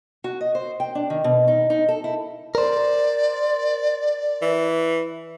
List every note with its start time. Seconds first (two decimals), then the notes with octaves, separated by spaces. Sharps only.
0.24 F#4
0.41 D#5
0.55 C5
0.80 G5
0.95 D4
1.10 D#3
1.24 B2
1.48 D#4
1.70 D#4
1.89 A4
2.04 E4
2.55 A#4 C5 D5
4.42 E3